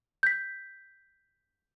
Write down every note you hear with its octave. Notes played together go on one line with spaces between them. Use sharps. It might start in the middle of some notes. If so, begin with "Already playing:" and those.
G6 B6